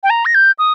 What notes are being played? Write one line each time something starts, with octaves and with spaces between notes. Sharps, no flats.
G5
A#5
A#6
G6
D#6